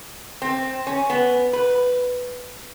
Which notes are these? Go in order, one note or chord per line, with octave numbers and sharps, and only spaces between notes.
C4
C#4
B3
B4